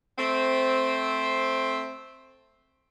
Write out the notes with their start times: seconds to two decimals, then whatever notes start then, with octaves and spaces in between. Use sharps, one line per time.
0.18 A3 C4